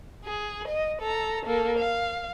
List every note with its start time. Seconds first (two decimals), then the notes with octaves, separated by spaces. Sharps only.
0.25 G#4
0.68 D#5
1.01 A4 A#5
1.46 A#3 A4
1.78 F5